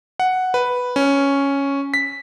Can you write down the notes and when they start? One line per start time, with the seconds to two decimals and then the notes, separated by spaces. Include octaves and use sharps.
0.20 F#5
0.54 B4
0.96 C#4
1.94 B6